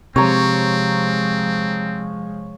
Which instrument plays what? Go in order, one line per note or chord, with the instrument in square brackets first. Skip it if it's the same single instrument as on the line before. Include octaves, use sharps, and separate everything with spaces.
[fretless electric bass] C3 [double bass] F3 G#3 [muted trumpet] C4 [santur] C#5 A#5